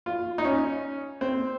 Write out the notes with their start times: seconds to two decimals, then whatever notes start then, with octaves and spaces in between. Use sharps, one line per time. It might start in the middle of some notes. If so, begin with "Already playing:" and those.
0.06 F4
0.38 D#4
0.45 C#4
1.21 C4